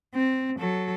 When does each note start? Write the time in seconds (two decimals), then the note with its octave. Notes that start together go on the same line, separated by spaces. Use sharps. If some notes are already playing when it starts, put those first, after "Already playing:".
0.15 C4
0.59 F#3 A4